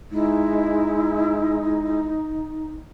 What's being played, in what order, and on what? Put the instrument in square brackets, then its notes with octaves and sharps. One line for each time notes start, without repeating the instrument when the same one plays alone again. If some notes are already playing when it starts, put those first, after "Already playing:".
[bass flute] G#3 [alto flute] D#4 [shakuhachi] E4